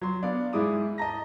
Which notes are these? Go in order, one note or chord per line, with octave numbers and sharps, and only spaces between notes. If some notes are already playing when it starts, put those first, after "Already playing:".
F#3 C6
B3 D4 D5 F5
G#2 E4 G#4 D6 D#6
D#5 A5 A#5 A#6